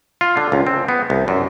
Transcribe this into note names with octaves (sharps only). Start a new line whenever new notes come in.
F4
D3
C#2
C4
B3
C2
F#2